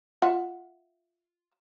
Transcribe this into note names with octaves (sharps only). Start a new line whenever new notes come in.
F4 E5 F#5